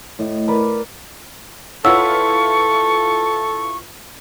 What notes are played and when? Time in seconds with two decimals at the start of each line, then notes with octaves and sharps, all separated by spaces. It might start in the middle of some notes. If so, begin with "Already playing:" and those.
0.19 A2 D#5
0.48 A#4 B4 D5
1.84 E4 F4 A4 B4 C#5 F#5 C#6 E6